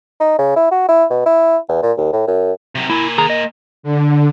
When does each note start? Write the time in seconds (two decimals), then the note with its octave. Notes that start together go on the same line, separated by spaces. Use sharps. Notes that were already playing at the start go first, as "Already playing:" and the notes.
0.20 D#4
0.39 C#3
0.56 E4
0.71 F#4
0.89 E4
1.10 B2
1.26 E4
1.69 E2
1.83 A#2
1.97 D#2
2.13 A2
2.27 F#2
2.75 C3 F#3
2.90 A#3 E4 G#5
3.18 D#2 G#4 A#5
3.30 D#5
3.83 D3